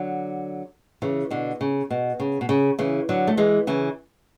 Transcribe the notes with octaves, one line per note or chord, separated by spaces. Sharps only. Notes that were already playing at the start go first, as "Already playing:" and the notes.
Already playing: D3 F#3
C#3 E3
B2 D3
C#3
B2
C#3
B2
C#3
C#3 E3
D3 F#3
A3
E3 G#3
C#3 E3